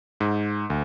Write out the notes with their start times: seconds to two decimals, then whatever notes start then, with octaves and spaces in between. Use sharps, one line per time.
0.20 G#2
0.70 D2